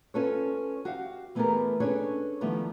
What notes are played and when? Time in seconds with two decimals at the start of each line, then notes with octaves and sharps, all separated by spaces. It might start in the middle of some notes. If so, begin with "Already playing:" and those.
0.14 C#4 F4 A4 B4 C#5
0.85 F#4 G4 F5
1.35 E3 A3 B3 G4 G#4 A#4
1.80 C#4 D4 G#4 A4 B4 C#5
2.41 D#3 F3 G3 A3 B3 E4